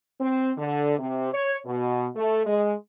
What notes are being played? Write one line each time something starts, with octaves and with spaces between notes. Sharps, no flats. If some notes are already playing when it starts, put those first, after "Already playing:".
C4
D3
C3
C#5
B2
A3
G#3